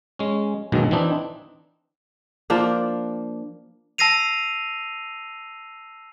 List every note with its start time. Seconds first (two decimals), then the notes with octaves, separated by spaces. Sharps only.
0.19 G#3 C#4
0.72 A#1 F#2 B2 D#3 G#3
0.91 E3 C4 D4 D#4
2.50 F3 A#3 D4
3.98 A5 E6 A#6 C7 D#7 F7